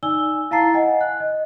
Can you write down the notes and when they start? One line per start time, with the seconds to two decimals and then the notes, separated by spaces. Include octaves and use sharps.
0.03 D#4 D5 G#5 E6 G7
0.51 E4 F5 A5 A#5 A6 C7
0.74 D#5 F#5 G#5
1.01 F#6
1.20 D#5